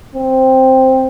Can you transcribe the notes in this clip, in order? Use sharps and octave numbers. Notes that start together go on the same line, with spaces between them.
C4